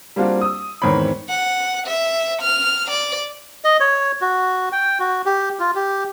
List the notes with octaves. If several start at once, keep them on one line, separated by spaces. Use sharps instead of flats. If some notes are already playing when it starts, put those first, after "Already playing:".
G3 A#3 C4 D4 F4 F#4
D#6 E6
E2 G#2 D#3 C4 C#5 B5
F#5
E5
F6
D5
D#5
C#5
F#4
G5
F#4
G4
F4
G4